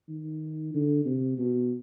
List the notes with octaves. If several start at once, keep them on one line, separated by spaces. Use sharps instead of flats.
D#3
D3
C3
B2